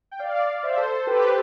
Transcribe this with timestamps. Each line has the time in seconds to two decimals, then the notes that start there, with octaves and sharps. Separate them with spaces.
0.11 G5
0.19 D5 F5
0.63 C5 E5
0.77 A4 C5
1.07 G4 B4